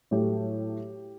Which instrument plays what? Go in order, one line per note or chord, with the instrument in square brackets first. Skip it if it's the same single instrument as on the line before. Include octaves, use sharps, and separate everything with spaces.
[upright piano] A2 F#3 A3 G4